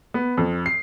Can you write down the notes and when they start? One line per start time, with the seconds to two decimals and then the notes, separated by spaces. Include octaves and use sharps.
0.14 B3
0.37 F2
0.66 C7